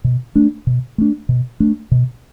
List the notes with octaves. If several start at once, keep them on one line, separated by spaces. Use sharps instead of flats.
B2
A3 D4
B2
A3 D4
B2
A3 D4
B2